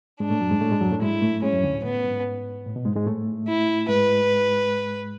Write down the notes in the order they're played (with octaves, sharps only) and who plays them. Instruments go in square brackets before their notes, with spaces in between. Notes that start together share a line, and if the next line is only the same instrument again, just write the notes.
[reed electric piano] G#2 G#3 [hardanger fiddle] D4
[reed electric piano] A2 A3
F#2 F#3
G#2 G#3
A2 A3
G#2 G#3
F#2 F#3
A2 A3
[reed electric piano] G#2 G#3 [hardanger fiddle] E4
[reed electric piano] A2 A3
[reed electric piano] G#2 G#3 [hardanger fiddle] C#4
[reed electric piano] F#2 F#3
D2 D3
A2
[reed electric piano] A2 [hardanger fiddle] B3
[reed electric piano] G#2
A2
B2
G#2 G#3
G#2 G#3
A2 A3
[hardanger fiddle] E4
[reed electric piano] G#2 G#3 [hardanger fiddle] B4